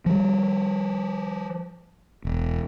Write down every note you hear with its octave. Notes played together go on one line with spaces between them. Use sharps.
F3 G3
E1